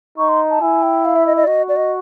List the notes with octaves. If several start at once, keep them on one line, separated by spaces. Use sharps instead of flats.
D#4 C#6
C6
A5
E4 G#5
G5
F5
E5
D#5
D#5
D5
F#4 D#5
D5
D#5